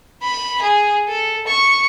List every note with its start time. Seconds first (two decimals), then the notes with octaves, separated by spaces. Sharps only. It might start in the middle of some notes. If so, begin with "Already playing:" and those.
0.22 B5
0.61 G#4
1.08 A4
1.47 C#6